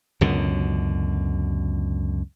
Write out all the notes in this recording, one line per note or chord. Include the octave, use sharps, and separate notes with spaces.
C#2 F#2 B2 D3